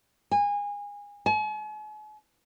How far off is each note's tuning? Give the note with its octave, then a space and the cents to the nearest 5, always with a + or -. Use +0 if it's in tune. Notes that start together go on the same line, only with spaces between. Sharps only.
G#5 -25
G#5 +45